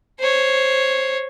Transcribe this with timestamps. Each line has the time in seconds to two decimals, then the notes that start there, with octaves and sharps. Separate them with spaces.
0.19 C5 C#5